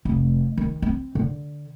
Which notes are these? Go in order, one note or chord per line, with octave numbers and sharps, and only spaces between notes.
F1
D#3
C4
D3